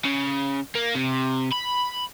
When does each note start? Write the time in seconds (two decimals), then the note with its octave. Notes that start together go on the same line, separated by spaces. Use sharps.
0.05 C#3
0.75 A#3
0.95 C3
1.52 B5